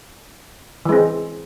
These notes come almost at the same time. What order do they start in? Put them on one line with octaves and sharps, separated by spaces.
E3 G#3 C4